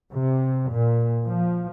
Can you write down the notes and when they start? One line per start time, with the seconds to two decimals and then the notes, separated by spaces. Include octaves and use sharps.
0.12 C3
0.71 A#2
1.27 F3